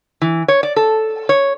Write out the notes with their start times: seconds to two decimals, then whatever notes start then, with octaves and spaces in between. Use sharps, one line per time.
0.21 E3
0.48 C#5
0.63 D5
0.76 A4
1.29 C#5